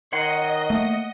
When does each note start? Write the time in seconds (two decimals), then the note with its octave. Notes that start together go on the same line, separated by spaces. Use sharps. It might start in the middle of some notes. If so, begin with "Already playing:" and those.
0.13 D#3 C#5 D#5 F#5 C6
0.70 A3 A#3